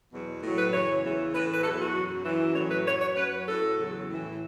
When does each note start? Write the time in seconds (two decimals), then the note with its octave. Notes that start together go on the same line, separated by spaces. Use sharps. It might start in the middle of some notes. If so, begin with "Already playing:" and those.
0.11 E2 B2 F#3
0.42 A2 F#3
0.57 B4
0.72 F#2 C#3 E3 C#5
1.02 E2 C#3 E3
1.33 A2 E3 B4
1.54 B4
1.64 E2 B2 F#3 A4
1.79 F#4
1.95 F#2 F#3
2.25 F#2 E3
2.55 A2 C#5
2.59 F#3
2.71 B4
2.86 F#2 F#3 C#5
3.01 C#5
3.16 F#2 F#3 B4
3.47 A2 F#3 A4
3.77 E2 C#3 F#3
4.08 A2 E3